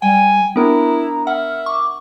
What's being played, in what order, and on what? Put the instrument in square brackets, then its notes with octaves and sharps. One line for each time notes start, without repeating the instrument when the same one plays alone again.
[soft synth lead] G3 [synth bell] G5 [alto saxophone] G#5
[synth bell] B3 D4 A#4 [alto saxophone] E4 [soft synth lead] A#5
[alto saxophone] E5 [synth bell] F#5 [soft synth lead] F6
[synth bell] C#6 [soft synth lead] D6